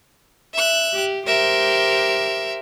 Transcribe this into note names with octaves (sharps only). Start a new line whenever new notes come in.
E5 F#6
G4
G4 A#4 C5 E5